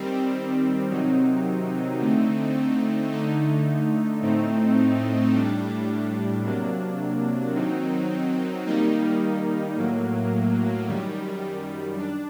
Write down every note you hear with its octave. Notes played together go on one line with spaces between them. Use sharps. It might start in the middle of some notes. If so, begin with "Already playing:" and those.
Already playing: D#3 G3 C4
C3 D#3 F#3 C4 D#4
D3 A3 C4 D#4
D3 A3 D#4
A2 A3 C4 D#4
A2 G3 D4
C3 F#3 A#3 D4
D#3 F#3 C4 D#4
D#3 G3 A#3 D#4
A2 F#3 A#3
F#2 D#3 G3
D4